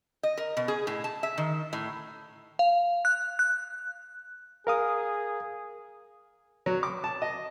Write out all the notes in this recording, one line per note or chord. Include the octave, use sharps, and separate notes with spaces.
D#5
A#4
B2
G#4
A2
A5
E5
D#3
A2
F5
F#6
F#6
G#4 A#4 F5 D#6
F#3
D6
A5
D#5